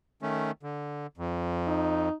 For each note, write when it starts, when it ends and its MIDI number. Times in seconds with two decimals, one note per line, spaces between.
0.22 0.51 51
0.22 0.51 57
0.22 0.51 61
0.63 1.07 50
1.18 2.09 41
1.67 2.14 63